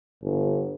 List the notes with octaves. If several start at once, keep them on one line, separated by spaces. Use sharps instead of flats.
G1